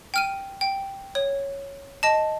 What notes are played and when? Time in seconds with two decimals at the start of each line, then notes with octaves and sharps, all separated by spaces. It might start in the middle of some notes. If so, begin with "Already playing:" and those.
0.14 G5 F6 D#7
0.61 G5
1.15 C#5
2.03 D#5 A5